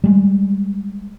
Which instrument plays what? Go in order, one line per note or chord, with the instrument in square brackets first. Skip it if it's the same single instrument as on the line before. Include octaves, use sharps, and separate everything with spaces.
[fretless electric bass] G3 G#3